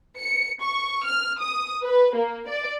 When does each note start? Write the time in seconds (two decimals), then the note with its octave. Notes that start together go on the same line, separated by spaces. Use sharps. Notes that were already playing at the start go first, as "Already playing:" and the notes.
0.20 C#7
0.61 C#6
1.05 F6
1.40 D#6
1.83 B4
2.16 A#3
2.48 D5